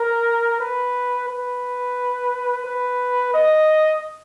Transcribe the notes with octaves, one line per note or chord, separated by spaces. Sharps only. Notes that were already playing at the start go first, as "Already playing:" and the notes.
Already playing: A#4
B4
B4
B4
D#5